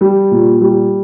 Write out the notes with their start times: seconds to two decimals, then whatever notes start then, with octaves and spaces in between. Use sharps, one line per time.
0.01 G3
0.31 A#2
0.61 G3